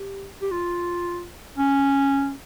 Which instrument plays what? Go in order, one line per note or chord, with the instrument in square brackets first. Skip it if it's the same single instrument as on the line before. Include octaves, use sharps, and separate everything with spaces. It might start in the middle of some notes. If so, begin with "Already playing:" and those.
Already playing: [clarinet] G4
G4
F4
C#4